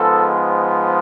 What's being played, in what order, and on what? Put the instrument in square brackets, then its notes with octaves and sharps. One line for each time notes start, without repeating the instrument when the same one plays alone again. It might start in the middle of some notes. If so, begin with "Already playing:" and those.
Already playing: [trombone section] G#2 F3 G#3 B3 A4